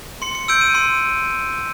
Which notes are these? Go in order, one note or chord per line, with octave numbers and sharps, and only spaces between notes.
C6 C#7
C#7
E6 G6 D7
D#7
C6 D#7